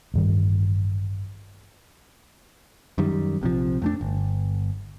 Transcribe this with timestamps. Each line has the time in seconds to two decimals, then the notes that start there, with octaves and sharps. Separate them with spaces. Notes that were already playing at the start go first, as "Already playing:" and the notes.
0.14 A1 G2 D#3 G3
2.98 F#2 D#3 G3
3.41 A#1 C3 E3 F3
3.82 F2 A3 D4
4.01 G1